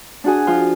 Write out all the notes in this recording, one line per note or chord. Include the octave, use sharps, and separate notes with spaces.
D4 F#4 G#4
F3 F4